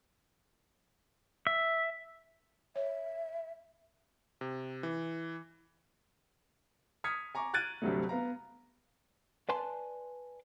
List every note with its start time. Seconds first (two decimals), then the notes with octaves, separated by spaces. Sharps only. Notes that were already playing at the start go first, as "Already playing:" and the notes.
1.47 E5
2.76 C#5 E5
4.41 C3
4.83 E3
7.04 D#6 F6 G#6 B6 C#7
7.35 G#5 A#5 C#6 D6
7.54 F6 F#6 G#6 A6 D7 D#7
7.82 D2 G2 C3 F#3 G3 A3
8.09 B3 F5 A#5
9.49 B4 D5 G#5 A5 C6